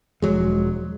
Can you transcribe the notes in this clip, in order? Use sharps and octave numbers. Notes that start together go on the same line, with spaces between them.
E1 F3 F#3 G#3